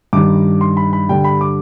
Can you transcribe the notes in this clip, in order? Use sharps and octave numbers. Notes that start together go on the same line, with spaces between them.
G2 D#3 G3 D6
C6
B5
B5
G2 D3 G3 G5
B5
D6